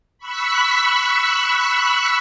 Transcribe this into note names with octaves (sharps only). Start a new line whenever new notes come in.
B5 C#6 E6 F#6 B6